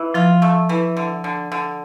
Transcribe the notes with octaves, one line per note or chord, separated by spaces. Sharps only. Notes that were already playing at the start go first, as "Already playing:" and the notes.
Already playing: E3
F3 F4
A3
E3
D3
D3
D3